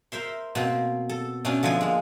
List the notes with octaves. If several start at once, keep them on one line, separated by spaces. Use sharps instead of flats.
A#4 C5 E5 C6
B2 A#3 C4
A4
B2 A3 B3 C#4 D4
D3 F3 A4 D#5 G#5
G#3 A#3